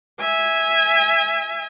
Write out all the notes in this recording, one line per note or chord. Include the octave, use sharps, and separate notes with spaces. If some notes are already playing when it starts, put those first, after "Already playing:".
E5 G#5